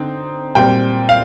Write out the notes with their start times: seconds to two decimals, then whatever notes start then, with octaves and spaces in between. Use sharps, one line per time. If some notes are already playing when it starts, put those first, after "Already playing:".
Already playing: D3 C4 D#4
0.55 A#2 G3 C4 G5
1.09 F5